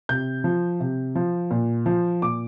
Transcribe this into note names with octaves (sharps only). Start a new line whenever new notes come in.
C3 G6
F3
C3
F3
A#2
F3
A#2 D6